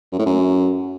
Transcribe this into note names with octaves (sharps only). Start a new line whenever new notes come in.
F#2
A2
F#2